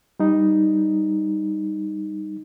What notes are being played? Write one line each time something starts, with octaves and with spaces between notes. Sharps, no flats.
G3 D#4